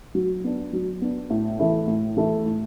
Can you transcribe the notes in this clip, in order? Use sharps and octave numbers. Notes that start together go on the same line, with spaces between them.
F#3
B3 D4
F#3
B3 D4
A2
E3 A3 E4
A2
E3 A3 E4
A2